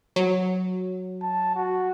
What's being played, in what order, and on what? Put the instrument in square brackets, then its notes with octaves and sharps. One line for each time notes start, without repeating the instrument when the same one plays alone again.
[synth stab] F#3
[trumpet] A5
F#4